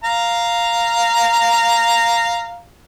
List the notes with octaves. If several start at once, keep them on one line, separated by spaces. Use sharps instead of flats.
F5 A#5